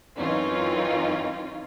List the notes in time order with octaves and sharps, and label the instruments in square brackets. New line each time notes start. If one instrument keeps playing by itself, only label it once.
[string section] F#2 E3 C4 C#4 D#4 F4